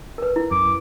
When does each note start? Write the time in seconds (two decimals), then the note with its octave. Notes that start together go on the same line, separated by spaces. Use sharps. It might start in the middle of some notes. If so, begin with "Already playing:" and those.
0.18 A#4 B4
0.36 E4
0.51 F#2 D6